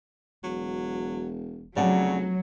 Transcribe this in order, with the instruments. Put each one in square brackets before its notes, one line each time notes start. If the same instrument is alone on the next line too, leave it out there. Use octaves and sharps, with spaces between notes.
[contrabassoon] E1 [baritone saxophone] F#3
[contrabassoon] F1 [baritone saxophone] C#3 [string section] F#3 [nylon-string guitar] D5 F#5 A5